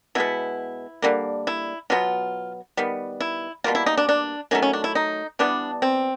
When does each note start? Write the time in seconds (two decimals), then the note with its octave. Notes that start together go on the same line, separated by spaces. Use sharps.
0.15 B2 G#3 B3 E4
1.02 D3 G3 A#3
1.47 E4
1.90 B2 F#3 B3 F4
2.77 D#3 G3 B3
3.20 E4
3.64 B2 G3 A#3 F4
3.75 E4
3.86 D#4
3.97 D4
4.09 D4
4.51 D#3 F#3 A3 C#4
4.62 C#4
4.73 D4
4.84 E4
4.95 D#4
5.39 E3 G3 B3 D4
5.82 C4